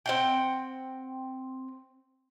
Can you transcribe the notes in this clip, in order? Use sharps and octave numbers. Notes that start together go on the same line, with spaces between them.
C4 F#5 G5